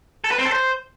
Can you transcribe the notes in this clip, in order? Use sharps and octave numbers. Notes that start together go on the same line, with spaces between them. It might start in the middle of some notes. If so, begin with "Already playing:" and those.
A4
B4
C4
A4
C5